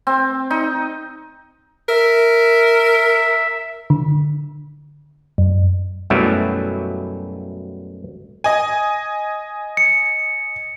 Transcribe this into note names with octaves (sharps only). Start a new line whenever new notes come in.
C4
D#4
A#4 E5
D3
F#2
F#2 B2 F#3 G3 A3 E4
D#5 G#5
C#7